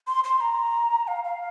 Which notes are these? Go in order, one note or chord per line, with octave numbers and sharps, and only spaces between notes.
C6
C6
A#5
F5
F5